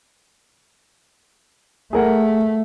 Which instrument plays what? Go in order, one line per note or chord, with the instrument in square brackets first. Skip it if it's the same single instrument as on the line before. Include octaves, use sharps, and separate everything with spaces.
[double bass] A3 [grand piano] G#4 A#4 F#5